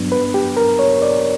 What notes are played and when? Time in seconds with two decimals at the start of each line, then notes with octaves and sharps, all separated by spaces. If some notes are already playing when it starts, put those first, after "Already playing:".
Already playing: G2 F#3 B3 D4
0.12 B4
0.34 G4
0.57 A#4
0.79 C#5
1.02 D5